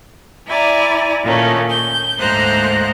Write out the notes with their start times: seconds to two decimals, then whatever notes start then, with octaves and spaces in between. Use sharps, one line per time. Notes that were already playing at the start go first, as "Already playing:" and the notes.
0.47 E4 D5 G#5 A#5
1.23 A#2 D#3 A3 C#4
1.70 G6
2.18 D2 G#2 A#3 C5 A#5 F#6